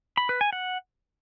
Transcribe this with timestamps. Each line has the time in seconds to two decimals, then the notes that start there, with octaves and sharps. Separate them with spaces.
0.17 B5
0.29 B4
0.41 G#5
0.53 F#5